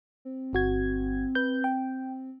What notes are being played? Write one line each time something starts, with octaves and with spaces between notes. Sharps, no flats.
C4
G1 F#4 G#6
B4 G6
G5